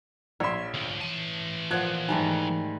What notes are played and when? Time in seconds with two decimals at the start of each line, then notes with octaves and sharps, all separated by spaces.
0.40 A#1 C#5 E5 C6
0.74 D2 F3
1.01 E3 A5 D#7
1.71 A#2 F3 F#5 F#6 G#6
2.09 G#2 D#3 G3 A3 G#5